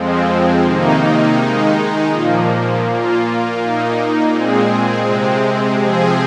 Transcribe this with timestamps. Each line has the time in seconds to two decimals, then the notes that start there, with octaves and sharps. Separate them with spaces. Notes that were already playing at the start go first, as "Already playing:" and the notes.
Already playing: F2 F3 G#3 C4
0.62 C3 D#3 A#3 D#4
1.36 D#3 G#3 D#4
2.10 A#2 F3 A#3
2.84 A#2 A#3 F4
3.58 A#2 A#3 D#4
4.31 A#2 G#3 C4 G#4
5.05 C3 G#3 C4
5.79 C3 F3 C4 G#4